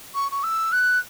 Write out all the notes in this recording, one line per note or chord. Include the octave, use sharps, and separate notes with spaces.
C#6
C#6
E6
F#6